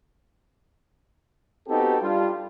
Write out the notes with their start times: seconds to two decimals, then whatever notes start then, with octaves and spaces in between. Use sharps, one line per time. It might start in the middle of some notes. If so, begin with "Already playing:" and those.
1.68 B3 C4 D#4 F#4 G4 A4
2.01 G3 D4 F4